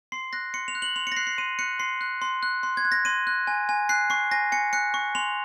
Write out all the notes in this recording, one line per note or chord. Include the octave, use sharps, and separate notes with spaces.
C6 C7
F#6 A#6
C6 C#7
F7
F#6
F#7
C6 F7
C#7
A#6
F#6 C7
C7
C6 D#7
F#6 C#7
C6 C7
F#6
C6
F#6
C6
G#6
F#6
A#6
C6 D#7
F#6
G#5
G#5
F#6 C7
C#6 C7
G#5 A#6
G#5 C#7
F#6 C#7
C#6
C6 F7